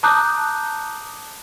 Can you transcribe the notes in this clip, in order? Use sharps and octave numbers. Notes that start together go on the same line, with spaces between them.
A5 A#5 D6 D#6 F#6 G6